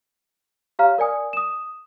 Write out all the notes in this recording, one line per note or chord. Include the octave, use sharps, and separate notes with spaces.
G4 C#5 F5 A#5 F6
A#4 D5 G#5 D#6
D#6 E7